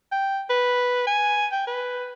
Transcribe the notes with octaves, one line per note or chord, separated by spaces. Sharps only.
G5
B4
G#5
G5
B4